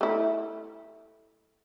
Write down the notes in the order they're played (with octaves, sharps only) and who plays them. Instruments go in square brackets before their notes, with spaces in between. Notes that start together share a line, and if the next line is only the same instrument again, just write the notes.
[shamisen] A3 E4